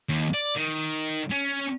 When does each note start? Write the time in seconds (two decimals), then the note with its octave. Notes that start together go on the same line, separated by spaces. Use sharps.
0.09 D#2
0.34 D5
0.56 D#3
1.31 C#4